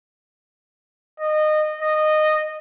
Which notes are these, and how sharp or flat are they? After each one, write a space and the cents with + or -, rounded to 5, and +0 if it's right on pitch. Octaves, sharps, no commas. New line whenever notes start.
D#5 -25
D#5 -15